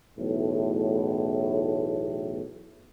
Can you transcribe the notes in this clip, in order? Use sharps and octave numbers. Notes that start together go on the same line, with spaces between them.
B1 E2 A2